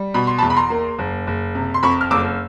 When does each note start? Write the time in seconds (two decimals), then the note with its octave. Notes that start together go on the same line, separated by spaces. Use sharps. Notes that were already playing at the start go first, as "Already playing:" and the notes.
Already playing: G3
0.14 B2 B5
0.27 C6
0.38 A5 B5
0.43 E2
0.50 B5
0.57 A#5 C6
0.70 A#3
0.99 F#1
1.27 F#1
1.55 C3
1.74 C6
1.83 F2 B5 C#6
2.01 F6
2.11 F#1 D6 E6